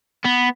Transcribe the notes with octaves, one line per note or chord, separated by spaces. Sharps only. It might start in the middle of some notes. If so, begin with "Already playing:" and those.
B3